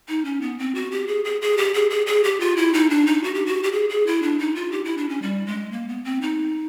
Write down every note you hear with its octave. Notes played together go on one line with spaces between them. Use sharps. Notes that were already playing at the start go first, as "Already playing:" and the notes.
D#4
C#4
B3
C4
F#4
G4
G#4
G#4
G#4
G4
G#4
G#4
G#4
G4
F4
E4
D#4
D4
D#4
F#4
G4
F#4
G4
G#4
G#4
E4
D4
D#4
F4
G4
E4
D4
C#4
G3
G#3
A#3
B3
C4
D#4